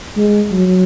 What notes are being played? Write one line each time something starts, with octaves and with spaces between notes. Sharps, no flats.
G#3
F#3